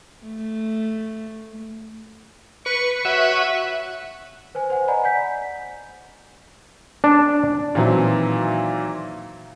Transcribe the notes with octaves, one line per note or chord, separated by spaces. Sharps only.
A3
B4 C#6
F#4 B4 C#5 E5 F#5
B4 C5 G#5
C5 F#5 G#5
D5 D#5 F#5 G#5 A#5 B5
F#5 G#5 G6 B6
D4
A#2 D#3 E3 F#3 C4 E4